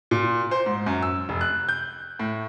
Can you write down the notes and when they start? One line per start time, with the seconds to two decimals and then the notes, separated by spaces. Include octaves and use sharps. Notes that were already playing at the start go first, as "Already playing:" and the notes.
0.11 A#2
0.51 C5
0.66 G#2
0.86 F#2
1.02 E6
1.29 F1
1.41 F#6
1.69 G6
2.19 A2